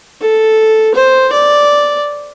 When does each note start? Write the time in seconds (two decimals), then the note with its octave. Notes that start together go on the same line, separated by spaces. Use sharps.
0.21 A4
0.95 C5
1.32 D5